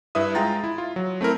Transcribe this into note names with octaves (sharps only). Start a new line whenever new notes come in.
G2 E4 B4 E5 D#6
G#3 F4 G5 A#5 A6
E4
F4
F#3
A3 C4 E4 A#4